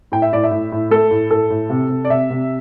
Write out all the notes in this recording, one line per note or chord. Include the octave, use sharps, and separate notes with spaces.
A2 G5
E5
A2 D5
E5
A2
A2
A3 A4
A2
A2 A4
A2
C3
C3
D5
C3 E5
C3